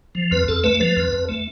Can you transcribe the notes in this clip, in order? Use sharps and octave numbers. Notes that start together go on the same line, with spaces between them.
F3
F2 B4
F2 A4
A3 B4
F3 B4
F2
F2
A3